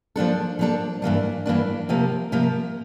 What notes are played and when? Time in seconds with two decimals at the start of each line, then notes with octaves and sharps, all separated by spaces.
0.16 F3 A#3 D4 A4
0.59 F3 A#3 D4 A4
1.02 G2 E3 A#3 D4
1.46 G2 E3 A#3 D4
1.89 C3 F3 A#3
2.32 C3 F3 A#3